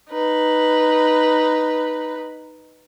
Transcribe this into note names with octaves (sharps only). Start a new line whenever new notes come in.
D#4 B4